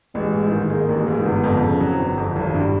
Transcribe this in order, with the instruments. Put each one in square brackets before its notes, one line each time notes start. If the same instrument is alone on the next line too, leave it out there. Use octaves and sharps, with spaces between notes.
[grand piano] A1 [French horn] G#3
[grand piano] G#2
D#3
[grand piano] G#3 [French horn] A#3
[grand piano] A1
G#2
[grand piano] G1 [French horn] B3
[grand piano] F2
C#3
[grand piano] F#3 [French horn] C4
[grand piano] G1
F2
[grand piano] G#1 [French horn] G3
[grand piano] G2